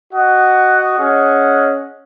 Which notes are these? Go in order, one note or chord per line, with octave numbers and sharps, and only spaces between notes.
F#4 D#5 F#5
C#4 G#4 D#5 F#5